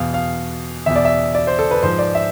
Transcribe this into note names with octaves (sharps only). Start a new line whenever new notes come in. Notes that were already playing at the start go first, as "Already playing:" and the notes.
Already playing: E2 B2 F5
F5
E2 B2 E5
D5
E5
D5
C5
A4
B4
G#2 F3 C5
D5
E5